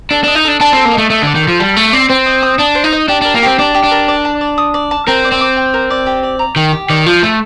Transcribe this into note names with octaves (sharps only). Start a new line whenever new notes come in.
D4 A4
D4 D#5
D#4
D4 A4
D4 A5
C4 A4
A#3
A3 D#5
A3 A4
D3 D5
D#3
F3 A4
G3 A5
A3 A4
C4 D5
C4 C5
D#5
D#6
D4 A5
C5
D#4
D#5
D4 G4
D4 A#4
A#3
C4 G4
D4 D5
G4
D4
A#4
D5
A5
D5
D#6
D5
A5
C4 A#4
D5
C4
D6
G5
A#4
D5
G4
D5
A#5
D#3 G5
G4
D#3 D5
F3 F4
A3 A4